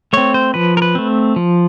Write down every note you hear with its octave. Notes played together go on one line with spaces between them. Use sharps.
A3 C4 C#5
C5
F3 B4
A#4
B4
A3 C4
F3